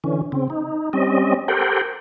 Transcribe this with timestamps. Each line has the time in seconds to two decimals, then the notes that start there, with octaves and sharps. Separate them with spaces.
0.04 D3 E3 C#4
0.32 C#3 C4
0.50 D#4
0.93 G3 C4 C#4 D#5
1.48 G4 A4 A#4 C5 F#5 G5